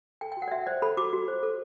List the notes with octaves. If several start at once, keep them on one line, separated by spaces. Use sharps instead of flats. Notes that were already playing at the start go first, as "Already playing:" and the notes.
A4 G5
G5
F#4
F#5
D5
F#4 E5
C5 D5
A4 B5
F#4 D6
F#4
C5
A4